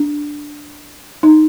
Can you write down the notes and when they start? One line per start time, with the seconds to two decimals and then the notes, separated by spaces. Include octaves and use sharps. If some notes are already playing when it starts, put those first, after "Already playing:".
Already playing: D4
1.23 D#4